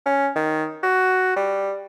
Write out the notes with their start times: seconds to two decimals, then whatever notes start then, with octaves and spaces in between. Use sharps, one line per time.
0.06 C#4
0.36 D#3
0.83 F#4
1.36 G3